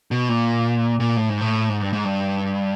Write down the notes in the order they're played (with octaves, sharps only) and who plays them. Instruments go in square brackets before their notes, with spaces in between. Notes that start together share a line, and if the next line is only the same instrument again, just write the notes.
[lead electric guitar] B2
A#2
A#2
A2
G#2
A2
G#2
G2
G#2
G2